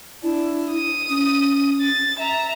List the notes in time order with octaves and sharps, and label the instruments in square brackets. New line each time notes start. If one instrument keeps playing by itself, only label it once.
[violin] D4 [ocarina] E4
[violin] D#6 D#7
[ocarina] C#4
[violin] A6
E5 A#5